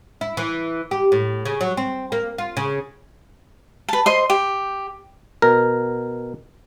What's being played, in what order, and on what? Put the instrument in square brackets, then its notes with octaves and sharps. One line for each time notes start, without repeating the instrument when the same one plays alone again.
[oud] E4
E3
G4
A2
C#3
F#3
C4
A#3
F4
C#3
[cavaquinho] B4 A5
C5 D#5 C6
G4
[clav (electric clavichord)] B2 A#4